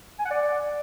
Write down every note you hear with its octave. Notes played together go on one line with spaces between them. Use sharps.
G#5
F#5
D5